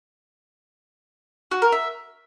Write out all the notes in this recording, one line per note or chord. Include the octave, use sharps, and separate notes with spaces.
F#4
A#4
E5